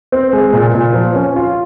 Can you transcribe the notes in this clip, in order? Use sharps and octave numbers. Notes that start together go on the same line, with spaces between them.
C4
G#3
A#2
A#2
F3
C#4
F4